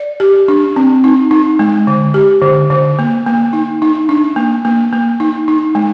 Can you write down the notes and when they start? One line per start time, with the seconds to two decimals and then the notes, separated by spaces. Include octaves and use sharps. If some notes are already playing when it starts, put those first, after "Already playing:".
Already playing: D5
0.20 G4
0.48 D4
0.76 C4
1.04 D#4
1.31 D#4
1.59 G#3
1.87 D3
2.14 G4
2.42 D3
2.70 D3
2.99 A#3
3.26 A#3
3.53 D#4
3.82 D#4
4.09 D4
4.36 A#3
4.65 A#3
4.93 A#3
5.20 D#4
5.48 D#4
5.75 G#3